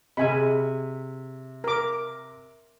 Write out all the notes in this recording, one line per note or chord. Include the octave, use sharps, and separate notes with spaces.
C3 G#4 D#5 G#5 B5
A#4 D6